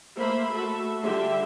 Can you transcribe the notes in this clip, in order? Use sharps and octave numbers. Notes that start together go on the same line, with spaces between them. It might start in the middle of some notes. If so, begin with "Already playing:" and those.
A3 A#3 C5 E5 B5
A3 F#4 A4 E5
D3 G3 F4 G4 E5 C6